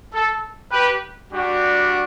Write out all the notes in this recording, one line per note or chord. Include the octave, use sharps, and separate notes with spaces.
A4
G4 B4
G3 D4 F#4